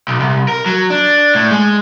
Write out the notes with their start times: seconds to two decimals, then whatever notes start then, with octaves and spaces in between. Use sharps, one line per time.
0.08 B1
0.20 C2
0.48 A#4
0.66 F#3
0.90 D4
1.35 A2
1.51 G#3